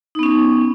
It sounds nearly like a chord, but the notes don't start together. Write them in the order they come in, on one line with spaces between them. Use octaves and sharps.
D#4 B3 C#4